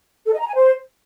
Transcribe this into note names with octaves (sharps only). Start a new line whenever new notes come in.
A4
D#5
A#5
G#5
C5